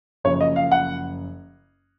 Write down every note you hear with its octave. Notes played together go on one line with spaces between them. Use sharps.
F#1 F#2 F3 C#5
D#5
F5
F#5